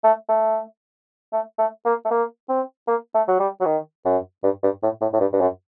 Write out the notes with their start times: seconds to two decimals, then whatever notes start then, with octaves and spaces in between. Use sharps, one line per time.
0.04 A3
0.29 A3
1.33 A3
1.58 A3
1.85 A#3
2.05 A3
2.11 A#3
2.49 C4
2.87 A#3
3.14 A3
3.28 F#3
3.40 G3
3.60 F#3
3.65 D#3
4.05 F#2
4.44 G2
4.63 G2
4.83 A2
5.01 A2
5.13 A2
5.20 G2
5.33 G2
5.41 F#2